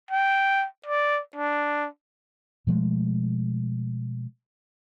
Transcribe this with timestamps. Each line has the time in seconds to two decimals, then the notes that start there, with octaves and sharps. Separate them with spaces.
0.11 G5
0.86 D5
1.36 D4
2.67 B2 F3 G#3 A3